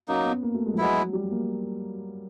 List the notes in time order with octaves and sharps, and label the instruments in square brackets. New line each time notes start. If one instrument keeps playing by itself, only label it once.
[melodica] F#3 A#3 D#4 [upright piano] C#4
[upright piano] B3
A#3
A3
G#3
F3
[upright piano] F#3 [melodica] G#3 B3 E4
[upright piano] F#3
G3
A#3